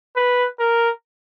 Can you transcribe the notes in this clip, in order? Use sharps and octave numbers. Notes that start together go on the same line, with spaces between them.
B4
A#4